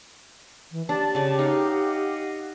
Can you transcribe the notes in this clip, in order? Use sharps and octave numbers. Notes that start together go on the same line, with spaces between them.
E3
D4 G4 A5
C#3 D5
D#4 D#5 F5 F#5